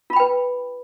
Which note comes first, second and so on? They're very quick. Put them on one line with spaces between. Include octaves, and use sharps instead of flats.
F4 B5 G5 B4